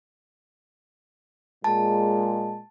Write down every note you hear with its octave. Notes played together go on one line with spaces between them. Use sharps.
A#2 G#3 A5